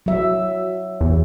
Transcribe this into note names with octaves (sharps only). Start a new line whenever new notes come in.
F#3 E5
E2